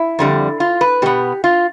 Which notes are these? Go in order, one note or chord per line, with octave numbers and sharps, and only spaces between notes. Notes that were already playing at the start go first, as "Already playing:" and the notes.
Already playing: E4
F2 D3 G3
F4
B4
B2 B3 G4
F4